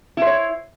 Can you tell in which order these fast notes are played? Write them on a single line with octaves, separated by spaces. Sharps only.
E4 C5 C#5